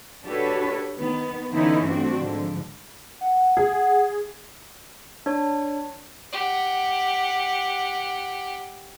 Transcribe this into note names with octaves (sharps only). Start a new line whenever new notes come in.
D4 F#4 G4 A4 B4 C#5
D#3 B3
D3 E3 B3 C#4 D#4 E4
G2 A3 C4 D4 F#4
G#2 D3 F3
F#5
G#4
D4 C#5
G4 F#5